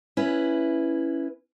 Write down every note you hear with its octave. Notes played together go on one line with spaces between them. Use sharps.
C#4 E4 B4